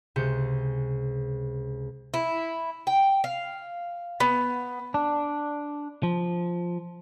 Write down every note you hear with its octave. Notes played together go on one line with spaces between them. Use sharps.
C#2 C3 G#3 G6 C#7
E4
G5
F5
B3
D4
F3